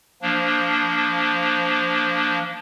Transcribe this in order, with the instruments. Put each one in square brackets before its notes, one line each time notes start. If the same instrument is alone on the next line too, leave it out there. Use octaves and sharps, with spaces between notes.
[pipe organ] F3 A#3 D4